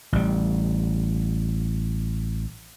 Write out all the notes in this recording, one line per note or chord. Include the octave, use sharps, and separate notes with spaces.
A1 G3